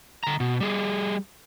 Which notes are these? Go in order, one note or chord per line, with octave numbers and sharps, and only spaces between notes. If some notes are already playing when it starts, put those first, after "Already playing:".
D3 A#5
B2
G3 G#4